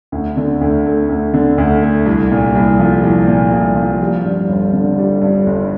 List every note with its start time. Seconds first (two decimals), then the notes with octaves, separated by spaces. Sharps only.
0.12 D2
0.37 D3
0.61 D2
0.86 A3
1.09 D2
1.34 D3
1.58 D2
1.82 A3
2.06 C2
2.31 A#2
2.55 C2
2.79 F3
3.03 C2
3.27 A#2
3.52 C2
3.76 F3
4.01 G3
4.25 G2
4.49 G1
4.73 D3
4.98 G3
5.22 G2
5.46 G1